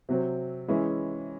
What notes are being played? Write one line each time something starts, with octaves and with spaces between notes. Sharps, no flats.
C3 F#3 C4
E3 G#3 C#4 E4